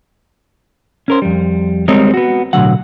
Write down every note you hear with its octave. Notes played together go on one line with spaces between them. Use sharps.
C#4 A#4 C5
F2 G3
G3 G#3 C4 A#4 C#5 D#5
B3 F#4
B1 A2 D3 F#3 F#5